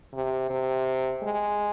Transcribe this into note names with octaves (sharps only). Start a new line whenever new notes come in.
C3
C3
G#3